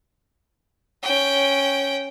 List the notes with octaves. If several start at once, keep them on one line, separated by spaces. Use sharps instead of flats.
C#4 G5